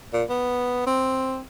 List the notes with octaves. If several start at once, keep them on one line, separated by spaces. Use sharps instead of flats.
A#2
B3
C4